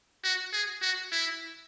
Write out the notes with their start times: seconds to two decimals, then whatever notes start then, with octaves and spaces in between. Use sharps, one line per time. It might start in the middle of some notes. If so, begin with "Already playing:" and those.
0.24 F#4
0.53 G#4
0.82 F#4
1.12 E4